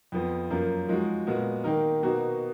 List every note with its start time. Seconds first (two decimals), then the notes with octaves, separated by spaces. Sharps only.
0.12 F2 F3 B3
0.50 F#2 F3 A#3
0.88 F3 G#3 D#4 F#4
1.27 A#2 G#3 B3 F#4
1.64 D#3 A#3 D#4 A#4
2.03 B2 A#3 D#4 F#4